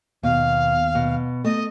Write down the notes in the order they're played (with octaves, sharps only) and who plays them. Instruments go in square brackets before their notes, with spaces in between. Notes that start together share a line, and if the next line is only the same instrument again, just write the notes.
[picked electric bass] D#2 [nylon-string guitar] B2 [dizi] F5
[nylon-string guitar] B2
[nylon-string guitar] A3 [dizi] D#5